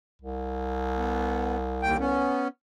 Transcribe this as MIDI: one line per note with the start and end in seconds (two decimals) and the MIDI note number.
0.22 2.30 36
0.97 1.57 59
1.82 1.97 39
1.82 1.97 79
2.00 2.48 59
2.00 2.48 61